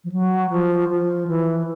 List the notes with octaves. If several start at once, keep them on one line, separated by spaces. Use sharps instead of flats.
F3
F#3
F3
F3
E3